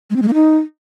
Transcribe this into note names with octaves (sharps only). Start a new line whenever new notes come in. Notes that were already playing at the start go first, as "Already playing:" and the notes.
G#3
C4
G#3
A#3
D#4